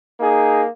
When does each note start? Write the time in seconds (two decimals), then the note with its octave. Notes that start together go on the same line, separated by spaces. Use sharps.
0.18 A#3 D#4 G#4